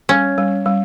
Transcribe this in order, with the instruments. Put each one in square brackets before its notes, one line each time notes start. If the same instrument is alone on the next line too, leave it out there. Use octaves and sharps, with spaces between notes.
[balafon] G3 [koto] C#4
[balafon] G3
G3